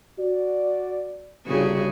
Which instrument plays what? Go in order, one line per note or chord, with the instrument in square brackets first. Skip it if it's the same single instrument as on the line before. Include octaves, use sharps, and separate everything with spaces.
[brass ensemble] F#4 D5
[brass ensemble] G1 [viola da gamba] C#3 F#4 G#4